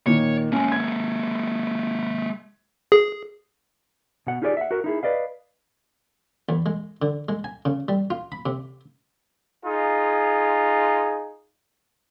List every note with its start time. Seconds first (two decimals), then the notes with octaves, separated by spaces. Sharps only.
0.06 A#2 D#3 C#5
0.52 G#3 A#3 C#4
0.72 G#6
2.92 G#4
4.27 B2 F#5
4.42 D#4 F4 G4 G#4 C#5 D5
4.57 E5 F#5
4.71 F#4 A#4
4.84 D#4 E4 G#4
5.03 B4 D5 D#5 F5
6.49 E2
6.66 G#3
7.02 D3
7.29 G#3
7.44 G#5
7.65 C#3
7.88 G3
8.10 F4
8.32 B5
8.46 C3
9.65 D#4 F4 G#4